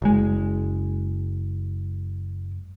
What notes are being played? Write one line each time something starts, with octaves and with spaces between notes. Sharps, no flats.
F#1 G#3